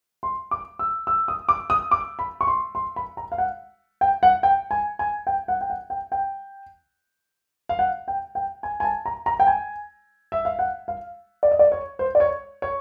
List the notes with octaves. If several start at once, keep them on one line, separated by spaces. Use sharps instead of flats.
C6
D6
E6
E6
D#6
D6
D#6
D6
B5
C#6
C6
C6
B5
A#5
F5
F#5
G5
F#5
G5
G#5
G#5
G5
F#5
G5
F#5
G5
G5
F5
F#5
G5
G5
G#5
G#5
A5
A#5
A#5
G5
G#5
E5
F5
F#5
F5
D5
D#5
D5
C#5
C5
D5
C#5
C#5